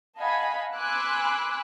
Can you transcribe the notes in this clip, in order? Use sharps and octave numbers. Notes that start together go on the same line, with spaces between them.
D#5 F5 F#5 G#5 A5 B5
G#5 B5 C6 D6 E6 F#6